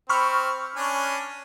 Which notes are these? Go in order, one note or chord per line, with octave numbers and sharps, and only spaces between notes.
C4 B5 C#6 F6
C#4 D4 G#5